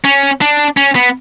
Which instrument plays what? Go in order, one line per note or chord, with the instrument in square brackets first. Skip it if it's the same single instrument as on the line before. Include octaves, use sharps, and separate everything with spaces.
[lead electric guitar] C#4
D4
C#4
B3